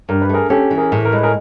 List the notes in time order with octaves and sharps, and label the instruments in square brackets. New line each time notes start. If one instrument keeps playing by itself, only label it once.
[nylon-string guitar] G2 [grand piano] A#4
[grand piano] B4
[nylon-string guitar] A3 [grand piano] G#4 A#4
[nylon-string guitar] C#4 [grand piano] G4 A4
[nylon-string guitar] E3
[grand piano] G#4 A#4
[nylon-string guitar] A2
[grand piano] A#4
[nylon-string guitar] G#3 [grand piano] B4
[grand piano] G#4 A#4